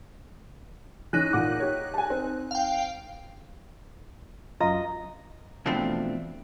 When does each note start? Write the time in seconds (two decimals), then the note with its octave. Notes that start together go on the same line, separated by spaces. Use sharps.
1.13 E3 C#4 D#4 F#6
1.33 A#2 F#5 D6
1.60 G4 C#5
1.94 G#5 A5
2.10 C4
2.51 F5 G5
4.61 F#2 F4 D#5 A#5
5.66 B2 E3 F3 A3 C4 D4